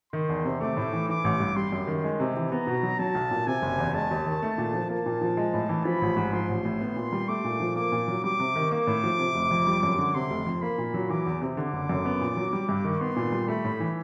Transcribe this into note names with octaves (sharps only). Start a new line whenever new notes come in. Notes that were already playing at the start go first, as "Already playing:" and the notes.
D#3 C6
E2
C3
A3 D6
A2
E3
E3 D6
A1
G2
G3 C6
F#2
D#3
G#3
C3
E3
B3 A#5
B2
F#3
F#3 A5
B1
A#2
C3 G#5
F#1
E2
G#3 A5
D#2
D#3
A3
A#2
F3
A#3 A5
A#2
F3
G#3
A2
E3
F3 B5
A1
G#2
F3 C6
A1
A2
B3
A#2
G3
A3 D6
A#2
F3
A#3 D6
A#2
F#3
G3 D6
C3
D#3
A#3 D6
A2
F3
C3
F1
F2
G3
F#2
D3
C3 C6
F1
F2
A#3 B5
A#2
F#3
E3 D6
E2
C3
D3 D6
F#1
F#2
B3
A#2
F#3
G3
G2
D#3
B3 C6
A#2
G3
A3 B5
A2
E3